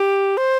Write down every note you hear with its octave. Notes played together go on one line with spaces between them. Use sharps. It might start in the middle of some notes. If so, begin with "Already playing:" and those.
Already playing: G4
C5